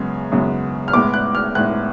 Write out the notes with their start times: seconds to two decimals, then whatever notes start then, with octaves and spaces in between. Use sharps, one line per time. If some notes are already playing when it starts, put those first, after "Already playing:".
Already playing: F#2 C#3 G#3 B3
0.32 F#2 C#3 G#3 B3
0.88 F6
0.93 A2 G#3 B3 D6
1.14 F#6
1.35 F6
1.55 A2 G#3 B3 F#6